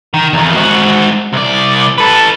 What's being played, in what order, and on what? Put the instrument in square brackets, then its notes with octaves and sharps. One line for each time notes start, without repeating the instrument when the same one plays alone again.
[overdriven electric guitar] D#3
E2 D#3
G#2 F#4
C2 D5
A4 B4